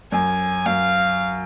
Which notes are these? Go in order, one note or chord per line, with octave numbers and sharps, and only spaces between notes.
F#2 G#5
F#2 F5